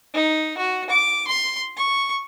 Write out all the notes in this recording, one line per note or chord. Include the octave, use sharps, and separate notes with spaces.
D#4
F#4
D6
C6
C#6